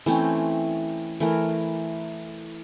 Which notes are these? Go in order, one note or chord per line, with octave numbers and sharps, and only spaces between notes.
E3 A3 C4 C#4
E3 A3 A#4